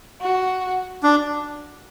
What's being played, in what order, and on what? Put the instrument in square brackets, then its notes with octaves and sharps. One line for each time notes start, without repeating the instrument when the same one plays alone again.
[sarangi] F#4
[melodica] D4